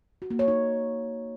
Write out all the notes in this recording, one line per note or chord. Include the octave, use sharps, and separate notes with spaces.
F#4
A#3
C#5
D#4